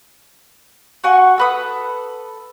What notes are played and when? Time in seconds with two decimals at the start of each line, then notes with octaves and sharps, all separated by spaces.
1.04 F#4 F#5 G#5 C#6
1.38 A4 B4 D#6